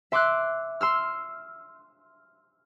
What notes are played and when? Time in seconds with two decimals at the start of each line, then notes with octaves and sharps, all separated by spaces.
0.12 E5 C6 D6 E6 F#6
0.81 C6 E6 F6